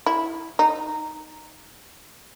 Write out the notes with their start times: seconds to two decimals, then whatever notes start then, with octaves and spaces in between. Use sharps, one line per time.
0.06 E4
0.59 D#4